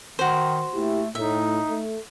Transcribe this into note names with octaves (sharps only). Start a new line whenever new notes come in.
D#3 F#4 C5
A#2 A3 E4 G4
A2 D#4 E5
A3